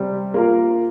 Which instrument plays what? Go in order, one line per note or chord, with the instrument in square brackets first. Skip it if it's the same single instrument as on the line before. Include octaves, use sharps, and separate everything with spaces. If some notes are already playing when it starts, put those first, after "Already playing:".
Already playing: [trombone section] C3 [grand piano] G3
[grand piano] A#3 F4 A#4